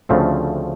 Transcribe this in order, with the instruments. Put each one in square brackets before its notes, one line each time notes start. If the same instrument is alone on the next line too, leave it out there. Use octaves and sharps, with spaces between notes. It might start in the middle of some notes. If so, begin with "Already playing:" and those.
[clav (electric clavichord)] D2 C#3 F3 A3 C4